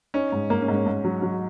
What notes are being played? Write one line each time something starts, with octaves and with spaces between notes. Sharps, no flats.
C#4 D#4
G#2
G#2 A#3
C#4
G#2
C#4
G#2
F#3
F#3